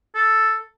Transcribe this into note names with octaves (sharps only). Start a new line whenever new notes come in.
A4